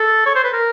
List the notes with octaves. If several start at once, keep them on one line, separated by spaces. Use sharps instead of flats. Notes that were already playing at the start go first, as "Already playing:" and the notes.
Already playing: A4
C#5
C5
B4
A#4